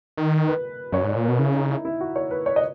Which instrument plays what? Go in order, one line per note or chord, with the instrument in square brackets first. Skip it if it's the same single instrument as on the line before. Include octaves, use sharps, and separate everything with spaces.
[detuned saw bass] D#3
[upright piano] B4
[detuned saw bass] F#2 [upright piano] C#5
[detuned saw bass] G#2
[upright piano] C#5
[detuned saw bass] A#2
[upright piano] A#4
[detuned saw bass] B2
[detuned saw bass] C#3 [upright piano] E4
[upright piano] D#4
E4
E4
F#4
C#5
B4
C#5
D#5